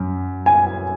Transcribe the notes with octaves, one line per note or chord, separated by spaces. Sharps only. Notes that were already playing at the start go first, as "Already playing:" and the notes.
Already playing: F#2
G#5